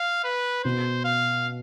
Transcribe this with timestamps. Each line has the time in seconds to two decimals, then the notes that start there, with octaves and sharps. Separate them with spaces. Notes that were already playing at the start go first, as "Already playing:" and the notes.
Already playing: F5
0.24 B4
0.64 B2 C5
1.05 F5